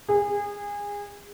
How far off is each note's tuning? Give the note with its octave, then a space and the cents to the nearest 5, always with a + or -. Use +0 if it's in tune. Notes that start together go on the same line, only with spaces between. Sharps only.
G#4 -25